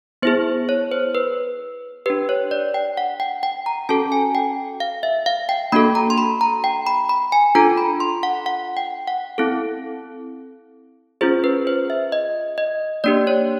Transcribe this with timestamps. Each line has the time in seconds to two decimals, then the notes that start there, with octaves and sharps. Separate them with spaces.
0.22 B3 E4 G#4 C5
0.69 C#5
0.92 C5
1.15 B4
2.06 D4 G4 B4
2.29 C#5
2.51 D5
2.74 G5
2.97 F#5
3.20 G5
3.43 G5
3.66 A#5
3.89 C#4 F#4 A4 A5
4.12 G#5
4.35 G5
4.80 F5
5.03 E5
5.26 F5
5.49 G5
5.72 A#3 D4 F#4 A4 B5
5.95 A#5
6.10 C6
6.18 B5
6.41 A#5
6.64 G5
6.87 B5
7.09 B5
7.32 G#5
7.55 D4 F4 A4 A#5
7.77 B5
8.00 C6
8.23 F#5
8.46 F#5
8.77 G5
9.07 F#5
9.38 C4 E4 A4
11.21 C#4 F4 G#4 C5
11.44 B4
11.67 C5
11.90 E5
12.12 D#5
12.58 D#5
13.04 A#3 D4 G4 D5
13.27 C#5